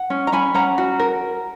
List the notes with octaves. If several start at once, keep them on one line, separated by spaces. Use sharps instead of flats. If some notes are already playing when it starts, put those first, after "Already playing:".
Already playing: F#5
C#4
A#5
C#4 G#5 B5
C#4 F#5 A#5
F#4
A#4